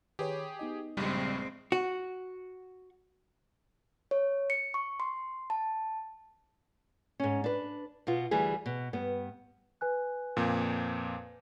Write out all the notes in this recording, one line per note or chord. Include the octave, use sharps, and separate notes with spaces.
D#3 G4 G#4 B4 C#5
B3 D#4 D#5
A#1 G2 C#3 G3 G#3 C4
F#4
C#5
C#7
C#6
C6
A5
G#2 C#4
D4 B4
B2 B3 F4
D2 E3 G3 G#4
B2
G2 B3
B4 G#5 F#6
F2 A#2